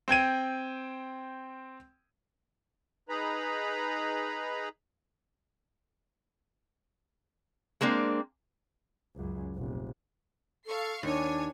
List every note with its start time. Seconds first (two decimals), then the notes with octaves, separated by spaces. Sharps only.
0.08 C4 G5 G#6 D#7
3.09 D#4 G#4 B4 A#5 B5
7.81 G#3 A#3 C4 D4
9.16 C#2 F#2
9.55 F1 A#1
10.66 A4 F5 C#6 C7
11.03 D#2 D4 C#5 G#5